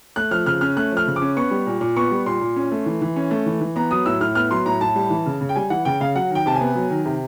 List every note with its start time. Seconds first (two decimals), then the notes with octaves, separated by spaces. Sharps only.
0.16 A3 F#6
0.31 F3 F6
0.46 C#3 F6
0.61 C#4 F6
0.77 A3 F#6
0.92 F3 F6
1.07 C#3
1.16 D6
1.22 C#4
1.36 B3 C#6
1.51 G3
1.67 A#2
1.81 A#2
1.97 B3 C#6
2.11 G3
2.26 A#2 C6
2.41 A#2
2.56 C#4
2.72 A3
2.86 E3
3.02 E3
3.16 C#4
3.31 A3
3.46 E3
3.61 E3
3.76 B3 A#5
3.91 F#3 D#6
4.06 A2 E6
4.20 A2 F6
4.35 B3 F6
4.51 F#3 C6
4.66 A2 A#5
4.81 A2 A5
4.96 G3
5.10 E3
5.26 C#3
5.41 C#3
5.49 G5
5.56 G3 G#5
5.70 E3 F#5
5.85 C#3 G5
6.00 C#3 F5
6.15 F#3 F#5
6.31 D#3 G5
6.46 C3 A5
6.56 G#5
6.61 B3
6.75 F#3
6.90 D#3
7.06 C3